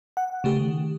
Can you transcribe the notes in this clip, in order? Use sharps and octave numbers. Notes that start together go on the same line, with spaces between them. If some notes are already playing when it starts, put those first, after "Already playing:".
F#5
C#3 A3 G4
D#3